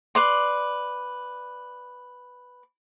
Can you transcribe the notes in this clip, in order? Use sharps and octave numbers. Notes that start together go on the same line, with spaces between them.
B4 D5 C6